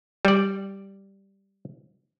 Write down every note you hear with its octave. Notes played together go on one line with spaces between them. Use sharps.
G3 D5